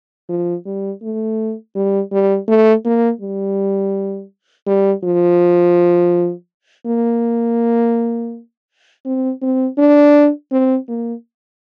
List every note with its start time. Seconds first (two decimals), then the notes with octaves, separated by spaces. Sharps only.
0.29 F3
0.66 G3
1.02 A3
1.75 G3
2.12 G3
2.48 A3
2.85 A#3
3.21 G3
4.67 G3
5.04 F3
6.87 A#3
9.05 C4
9.42 C4
9.78 D4
10.51 C4
10.88 A#3